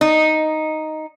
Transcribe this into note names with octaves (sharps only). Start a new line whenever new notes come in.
D#4